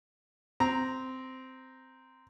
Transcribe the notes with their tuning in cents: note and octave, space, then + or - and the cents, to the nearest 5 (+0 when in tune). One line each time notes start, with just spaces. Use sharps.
C4 -10 A#5 +0